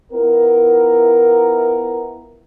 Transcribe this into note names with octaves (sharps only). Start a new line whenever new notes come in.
B3 E4 F4 A#4